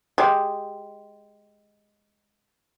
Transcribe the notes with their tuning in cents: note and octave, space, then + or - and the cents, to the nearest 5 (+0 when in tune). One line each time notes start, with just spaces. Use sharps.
G#3 +0 G4 +0